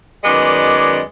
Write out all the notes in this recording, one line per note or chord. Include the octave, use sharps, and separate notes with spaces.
F#2 D#3 G#3 B3 D5